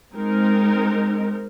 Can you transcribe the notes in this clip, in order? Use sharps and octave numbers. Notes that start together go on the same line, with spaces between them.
G#3 C4 D#4 A#4